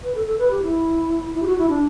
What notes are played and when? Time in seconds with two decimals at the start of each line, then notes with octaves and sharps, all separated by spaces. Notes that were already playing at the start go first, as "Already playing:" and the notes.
0.03 B4
0.15 A4
0.26 A4
0.39 B4
0.51 G4
0.63 E4
1.35 E4
1.42 G4
1.47 F#4
1.59 E4
1.69 D4